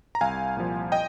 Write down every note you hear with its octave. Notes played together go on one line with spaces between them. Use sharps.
A#5
C2 F5 G#5
A#2 F3
D#5 G5